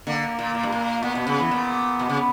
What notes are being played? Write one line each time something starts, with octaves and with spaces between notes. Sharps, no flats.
D3 A#3
A#2
A#2
G2
A#2
A#2 B3
B2
C#3
E3
A#2
B2
C#3